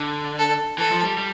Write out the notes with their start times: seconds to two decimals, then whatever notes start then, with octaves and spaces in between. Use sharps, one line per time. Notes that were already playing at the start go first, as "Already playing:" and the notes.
Already playing: D3
0.39 A4
0.78 E3 A4
0.91 F3
1.04 G3
1.17 G3